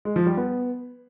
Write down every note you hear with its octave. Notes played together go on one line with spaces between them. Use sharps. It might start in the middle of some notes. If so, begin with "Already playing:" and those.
G#3
F3
G3
B3